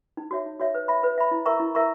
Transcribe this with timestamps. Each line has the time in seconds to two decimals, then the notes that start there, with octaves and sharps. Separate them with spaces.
0.17 D#4
0.31 F#4 C#5 E5
0.46 D#4
0.60 F#4 C#5 E5
0.75 B4
0.88 E5 B5
1.03 B4
1.18 E5 B5
1.31 E4
1.46 A#4 E5 A#5 C#6
1.60 E4
1.75 A#4 E5 A#5 C#6